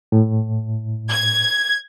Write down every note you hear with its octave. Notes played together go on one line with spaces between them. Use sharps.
A2
G#6